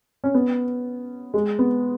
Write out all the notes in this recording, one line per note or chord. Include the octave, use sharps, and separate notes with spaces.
C#4
B3
G#3
B3